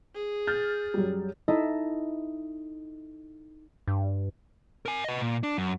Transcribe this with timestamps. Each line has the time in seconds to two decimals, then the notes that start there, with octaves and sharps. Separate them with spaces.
0.14 G#4
0.47 F6 G6 A6
0.94 F#2 G3
1.48 D#4 E4 A4 D#5 E5
3.87 G2
4.86 A#4 G#5
5.04 B4 D#5
5.21 A#2
5.43 D4
5.58 F#2